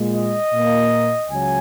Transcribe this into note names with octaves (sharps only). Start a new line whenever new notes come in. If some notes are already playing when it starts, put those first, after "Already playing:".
Already playing: A#2 G#3
D#5
A#2 A#3
C#2 C#3 F#3 G#5